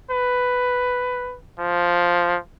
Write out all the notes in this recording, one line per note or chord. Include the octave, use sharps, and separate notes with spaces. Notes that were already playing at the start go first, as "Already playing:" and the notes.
B4
F3